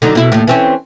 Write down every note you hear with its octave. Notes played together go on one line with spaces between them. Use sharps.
D3 F#3 D#4
B2 E4
D#2 A2
E3 C4 C#4